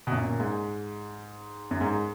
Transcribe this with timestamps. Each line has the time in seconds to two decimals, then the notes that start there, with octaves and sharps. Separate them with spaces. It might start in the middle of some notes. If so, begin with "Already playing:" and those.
0.07 B2
0.12 F#2 A#2
0.29 A#2
0.40 G#2
1.71 F#2
1.81 G#2